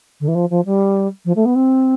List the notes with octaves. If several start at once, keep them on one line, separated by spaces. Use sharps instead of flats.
D3
E3
F3
F3
G3
F3
A3
B3
C4